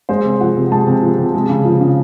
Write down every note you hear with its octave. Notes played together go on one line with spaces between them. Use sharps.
G#3 C5
C3
F3 F#5
C3
G#3 A5
C3
F3
C3
G#3
C#3
F3
C#3